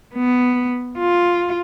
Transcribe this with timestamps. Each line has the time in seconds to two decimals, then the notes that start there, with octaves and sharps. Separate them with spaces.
0.15 B3
0.98 F4